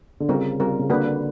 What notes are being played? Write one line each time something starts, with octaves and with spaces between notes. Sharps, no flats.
D3
C#3 G3 C4 F4 A#4
G3 C4 F4 A#4
C#3
D3 A#3 D4 F#4 B4